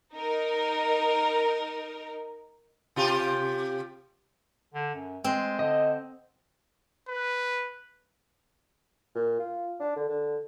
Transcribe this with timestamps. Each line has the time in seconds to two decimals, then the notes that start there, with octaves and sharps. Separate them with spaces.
0.12 D#4 A#4
2.96 C3 F4 G4
4.74 D3
4.95 F#2
5.24 G#3 C4
5.59 D3 D#5
7.08 B4
9.15 A#2
9.40 F4
9.80 D4
9.96 D3
10.09 D3